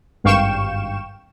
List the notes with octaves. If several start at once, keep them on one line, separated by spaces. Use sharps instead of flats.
G#1 G2 F5 G5 C#6 E7